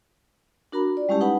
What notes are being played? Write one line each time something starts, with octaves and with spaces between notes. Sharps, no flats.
D4 F#4 A#4 A#5 B5
F4 D5
G3 G#3 C#4 E4 G4 A5
D#4 B4 F#5 A5 B5